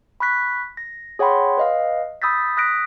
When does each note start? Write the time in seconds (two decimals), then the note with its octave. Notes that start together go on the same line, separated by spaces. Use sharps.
0.20 B5 C#6 F#6 B6
0.77 A#6
1.19 G#4 C#5 F#5 G5 B5 C6
1.57 B4 D#5 F5
2.22 B5 D#6 E6 G6 A6 B6
2.57 D#6 F#6 A#6 B6 D7